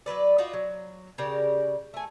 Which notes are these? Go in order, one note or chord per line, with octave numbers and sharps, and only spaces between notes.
F#3 G3 B4 D5
D#4 F4 F#4 D5
F#3
C#3 G4 A#4 D5
A3 G#5